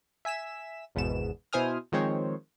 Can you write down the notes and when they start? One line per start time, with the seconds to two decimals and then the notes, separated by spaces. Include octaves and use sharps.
0.25 E5 G#5 B6 E7
0.95 G#1 E2 G#2 B2 B3 E7
1.53 B2 E4 C5 G#5 D#6 F6
1.92 D#3 F3 G#3 C4 C5 C#5